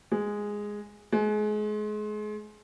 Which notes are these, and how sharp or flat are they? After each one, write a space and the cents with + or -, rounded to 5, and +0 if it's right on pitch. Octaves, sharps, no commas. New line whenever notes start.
G#3 -5
G#3 +30